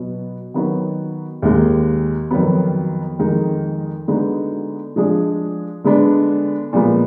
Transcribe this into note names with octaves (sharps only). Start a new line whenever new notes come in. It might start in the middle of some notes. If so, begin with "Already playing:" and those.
Already playing: B2 F#3 B3
D#3 F#3 B3 D#4 F#4
D#2 D#3 G#3
F2 D#3 F#3 B3
F2 D#3 G#3 D#4
D3 G#3 B3 D#4 F#4
F3 G#3 D4 G#4
D3 G#3 B3 D4
A#2 F3 G#3 B3